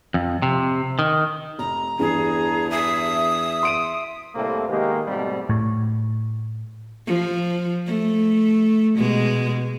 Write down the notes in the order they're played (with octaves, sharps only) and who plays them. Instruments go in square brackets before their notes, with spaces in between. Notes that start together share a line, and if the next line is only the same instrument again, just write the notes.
[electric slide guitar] F2
C3
D#3
[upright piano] F1 [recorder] A#5
[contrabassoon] E2 [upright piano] G2 E3 [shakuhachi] G#4
[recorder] E5 [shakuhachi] D#6
[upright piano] C6 D7 D#7
[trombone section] C2 A2 C3 A#3 C4 A4
D#3 G#3 A#3 B3 G4
G#2 B2 G3 A3 C4
[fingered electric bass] A2
[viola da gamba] F3
A3
B2 G#3